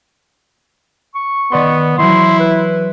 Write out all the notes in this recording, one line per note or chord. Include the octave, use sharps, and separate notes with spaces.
C#6
D#3 B3 D5 C6
E3 F#3 E4 C6
B4